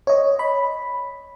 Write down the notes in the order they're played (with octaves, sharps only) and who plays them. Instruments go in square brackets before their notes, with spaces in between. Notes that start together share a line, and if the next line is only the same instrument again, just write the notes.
[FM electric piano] C#5 D#5
B5